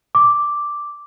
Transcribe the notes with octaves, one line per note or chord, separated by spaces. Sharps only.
D6